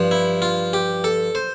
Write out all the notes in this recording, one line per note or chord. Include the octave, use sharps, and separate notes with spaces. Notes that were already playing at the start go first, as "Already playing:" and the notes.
Already playing: G2 F3
E4
F4
G4
A4
C5